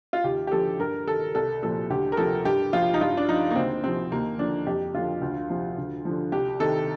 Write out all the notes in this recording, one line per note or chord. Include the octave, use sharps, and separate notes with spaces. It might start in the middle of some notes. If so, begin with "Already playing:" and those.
F4
D#2 G4
G4
D3 F3 A4
G2 A#4
D#3 A4
C2 A4
A#2 F3 A4
D2 G4
A#4
C3 F3 A4
G2 G4
F3 F4
D#4
G2 F4
D4
F3 D#4
A#3
D2 C4
C3 F3 C4
D#2 A#3
D3 F3 D4
F2 G4
D3 F3 F4
D2
C3 F3
D2
D3 F3
C2 G4
C3 D#3 A4